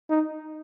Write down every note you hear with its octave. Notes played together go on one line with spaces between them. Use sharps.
D#4